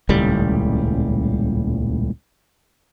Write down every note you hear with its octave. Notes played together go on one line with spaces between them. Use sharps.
D#1 C#2 A2 G3